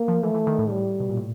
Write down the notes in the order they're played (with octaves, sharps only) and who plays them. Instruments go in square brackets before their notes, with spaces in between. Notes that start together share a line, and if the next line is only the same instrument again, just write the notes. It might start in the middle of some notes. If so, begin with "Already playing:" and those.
Already playing: [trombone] A#3
[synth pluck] F3
[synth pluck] E3 [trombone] A3
[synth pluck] E3
D#3
A2
[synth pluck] A2 [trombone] G3
[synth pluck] B2
A#2
A2